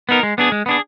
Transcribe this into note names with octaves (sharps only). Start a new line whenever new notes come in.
B3 D#4 A#4
G#3
B3 D4 G#4
G#3
B3 D4 G#4